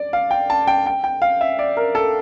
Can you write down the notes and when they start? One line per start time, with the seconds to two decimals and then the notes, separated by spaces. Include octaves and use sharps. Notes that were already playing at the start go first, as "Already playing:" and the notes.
Already playing: D5
0.13 F5
0.31 G5
0.50 A5
0.67 G5
0.86 G5
1.04 G5
1.22 F5
1.41 E5
1.59 D5
1.77 A#4
1.95 A4